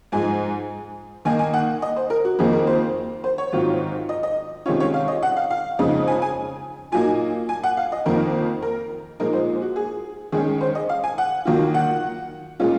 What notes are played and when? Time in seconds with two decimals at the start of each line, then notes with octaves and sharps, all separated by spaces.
0.12 G#2 F3 G#3 G#5
1.25 D#3 A#3 D#4 G#5
1.39 G#5
1.54 F#5
1.82 D#5
1.96 C5
2.10 A#4
2.25 F#4
2.39 F2 D#3 A#3 D#4 G#4
2.53 A#4
2.67 C5
3.24 C5
3.38 C#5
3.52 G#2 D#3 F#3 C4 F4
4.09 D#5
4.23 D#5
4.66 C3 D#3 G#3 C#4 F4 C#5
4.80 C#5
4.94 F5
5.08 D#5
5.23 F#5
5.37 F5
5.51 F5
5.79 F2 C#3 G#3 C4 D#4
6.07 G#5
6.22 G#5
6.92 A#2 F#3 A#3 D#4 G#5
7.49 G#5
7.63 F#5
7.77 F5
7.92 D#5
8.06 F2 D#3 A#3 A#4
8.62 A#4
9.19 A#2 F3 G#3 D#4 A#4
9.33 C5
9.62 F#4
9.76 G#4
10.32 D#3 G#3 C#4 G#4
10.61 C5
10.75 D#5
10.89 F5
11.04 G#5
11.18 F#5
11.45 D#3 F#3 A#3 F4
11.74 F#5
12.60 A#2 G#3 C#4 F4